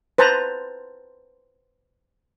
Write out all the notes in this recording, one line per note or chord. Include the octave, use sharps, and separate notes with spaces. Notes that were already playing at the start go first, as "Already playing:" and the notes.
B4 C5 A5 A#5